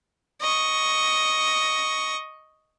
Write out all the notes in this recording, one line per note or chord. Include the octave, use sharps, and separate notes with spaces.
D#5 C#6